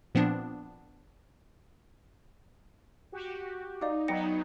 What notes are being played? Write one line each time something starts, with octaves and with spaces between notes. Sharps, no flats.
A#2 F3 B3 C4 D4
F#4 G4
D#4 D5 F5 D6
F#3 B3 G5 A#6 C#7